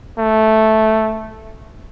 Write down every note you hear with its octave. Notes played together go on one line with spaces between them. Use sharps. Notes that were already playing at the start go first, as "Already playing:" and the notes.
A3